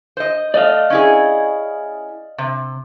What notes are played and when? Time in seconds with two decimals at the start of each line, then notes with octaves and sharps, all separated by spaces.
0.17 C5 D#5
0.54 A3 D5 D#5 F5
0.90 C#4 E4 G#4
2.38 C3